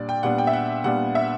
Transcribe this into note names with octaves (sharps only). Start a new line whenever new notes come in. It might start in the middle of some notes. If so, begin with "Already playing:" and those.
Already playing: A#2 G3 D4 D5
G5
A#2 G3 B3 D4 F#5
G5
E5
F#5
A#2 G3 B3 D4 F#5
E5